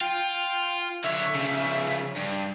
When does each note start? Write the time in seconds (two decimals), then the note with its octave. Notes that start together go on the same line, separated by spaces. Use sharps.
0.01 F4 G5
1.04 D3 C#5 E5
1.34 C#3 F3
2.17 G2